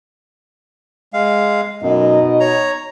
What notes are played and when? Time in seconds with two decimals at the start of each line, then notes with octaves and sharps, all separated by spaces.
1.13 G#3 F5
1.82 F#2 B2 D#4 D#5
2.40 C#5 A#5